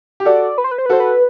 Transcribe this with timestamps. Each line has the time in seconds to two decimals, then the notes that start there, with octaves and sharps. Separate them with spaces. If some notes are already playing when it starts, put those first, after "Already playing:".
0.20 G4
0.25 F#4 A4 D5
0.58 B4
0.64 C5
0.71 B4
0.78 C5
0.86 B4
0.89 F#4 A4 C5
1.00 B4